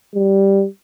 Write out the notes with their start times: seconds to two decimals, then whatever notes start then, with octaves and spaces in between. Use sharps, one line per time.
0.15 G3